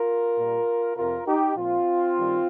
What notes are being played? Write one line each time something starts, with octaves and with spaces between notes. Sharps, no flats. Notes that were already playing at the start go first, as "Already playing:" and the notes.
Already playing: F4 A#4
A#2 G3
F2 C3 F3 F4 A#4
D#4 G4
A#2 F3 C4 F4
G2 D#3 G3